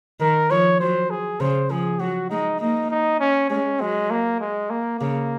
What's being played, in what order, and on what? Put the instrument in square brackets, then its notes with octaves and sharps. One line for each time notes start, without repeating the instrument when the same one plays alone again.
[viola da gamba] D#3 [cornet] A#4
[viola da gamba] F3 [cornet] C#5
[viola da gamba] F#3 [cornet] C5
[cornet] G#4
[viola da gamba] C#3 [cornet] C5
[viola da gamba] F3 [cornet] G#4
[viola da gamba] F#3 [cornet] F#4
[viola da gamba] G#3 [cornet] D#4
[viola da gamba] A#3 [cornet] D#4
[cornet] D#4
C#4
[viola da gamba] G#3 [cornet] C#4
[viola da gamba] F#3 [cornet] G#3
[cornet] A#3
G#3
A#3
[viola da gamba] C#3 [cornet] A#3